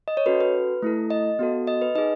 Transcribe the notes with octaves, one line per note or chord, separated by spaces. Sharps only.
D#5
C#5
C#4 F#4 A4 B4
B4
A3 E4 A4
D#5
B3 F#4 A4
D#5
B4
D#4 G#4 D#5